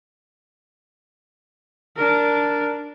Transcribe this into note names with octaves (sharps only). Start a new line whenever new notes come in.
D4 A#4